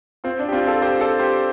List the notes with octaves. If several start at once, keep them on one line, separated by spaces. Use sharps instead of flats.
C4 F4
D4
G4
C4 F4
F4 A4
G4 C5
A4 D5
G4 C5